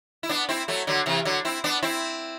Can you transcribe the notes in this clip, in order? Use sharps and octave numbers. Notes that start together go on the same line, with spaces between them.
E4
B3 D4
C4 E4
F#3 A3
D3 F#3
C3 E3
D3 F#3
C4 E4
B3 D4
C4 E4